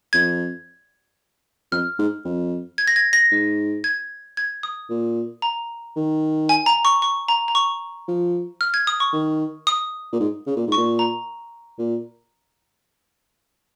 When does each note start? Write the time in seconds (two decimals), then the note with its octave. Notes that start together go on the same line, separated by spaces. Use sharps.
0.13 F2 G#6
1.72 F2 F6
1.99 G#2
2.25 F2
2.78 G#6
2.88 A#6
2.96 G#6
3.13 A#6
3.32 G#2
3.84 G#6
4.37 G#6
4.63 D#6
4.90 A#2
5.42 A#5
5.96 D#3
6.49 G#5
6.66 A#5
6.85 C#6
7.02 C#6
7.28 A#5
7.48 A#5
7.55 C#6
8.08 F3
8.61 F6
8.74 G#6
8.87 D#6
9.00 C#6
9.13 D#3
9.67 D#6
10.13 A#2
10.20 G#2
10.47 C#3
10.56 A#2
10.67 G#2
10.72 A#2 C#6
10.99 A#5
11.79 A#2